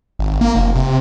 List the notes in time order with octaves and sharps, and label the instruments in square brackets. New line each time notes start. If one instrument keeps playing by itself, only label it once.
[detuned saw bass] G#1
A#3
F1
C3